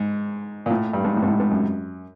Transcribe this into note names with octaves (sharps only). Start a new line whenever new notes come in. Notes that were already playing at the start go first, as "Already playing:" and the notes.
Already playing: G#2
A#2
A2
G2
G#2
A2
G#2
A2
G#2
F#2